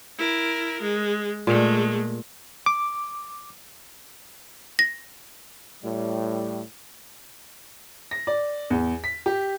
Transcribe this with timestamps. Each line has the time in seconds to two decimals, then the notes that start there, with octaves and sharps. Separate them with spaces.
0.19 E4 A#4
0.82 G#3
1.47 A#2 G#3 A3
2.66 D6
4.79 A#6
5.83 A2 G3
8.11 A#6
8.27 D5
8.70 E2
9.04 B6
9.26 G4